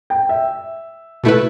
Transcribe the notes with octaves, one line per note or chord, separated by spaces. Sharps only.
G5
E5
B2 A3 E4 B4